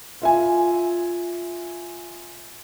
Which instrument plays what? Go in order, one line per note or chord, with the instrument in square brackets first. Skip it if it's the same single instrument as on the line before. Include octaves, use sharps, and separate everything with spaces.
[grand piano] F4 E5 G#5